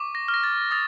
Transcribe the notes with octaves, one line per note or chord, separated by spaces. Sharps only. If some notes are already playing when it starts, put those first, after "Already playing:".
Already playing: C#6 D6
A#6
F6
A#6
A6
D#6 A6